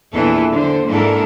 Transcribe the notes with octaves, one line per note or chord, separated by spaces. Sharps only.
E2 A#2 E3 D4 A4
D3 C5
G#2 A#3 D4 E4 A4 A#4